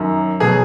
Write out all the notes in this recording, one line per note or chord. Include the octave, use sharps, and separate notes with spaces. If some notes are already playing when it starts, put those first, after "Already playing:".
Already playing: F#2 D#3 F#3
B2 F#3 G#4